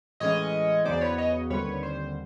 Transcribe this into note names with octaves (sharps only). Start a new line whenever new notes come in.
A2 E3 G#3 C#4 C#5 D#5
E2 C#3 F#3 B3 C5 D5
B4 C#5
C#5 D#5
D#2 D3 G3 C4 B4 C#5
C5